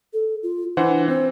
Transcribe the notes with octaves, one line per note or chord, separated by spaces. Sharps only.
A4
F4
E3 D4 C5 F#5
C4 C5